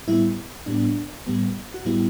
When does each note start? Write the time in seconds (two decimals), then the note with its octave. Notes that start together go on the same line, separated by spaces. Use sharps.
0.08 A2 G3 B3 E4
0.66 A2 G3 B3 D4
1.27 A2 G3 B3
1.74 F#4
1.85 A2 G3 B3 E4